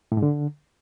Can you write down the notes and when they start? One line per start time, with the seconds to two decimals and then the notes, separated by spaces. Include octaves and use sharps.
0.12 A2
0.17 G#2
0.22 D3